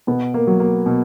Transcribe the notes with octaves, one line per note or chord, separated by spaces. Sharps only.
B2 B3
A#3
F#3
A#3
B2